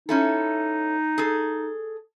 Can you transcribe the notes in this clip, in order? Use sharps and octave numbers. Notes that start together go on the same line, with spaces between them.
C#4 D#4 E4 A4
G#4 A4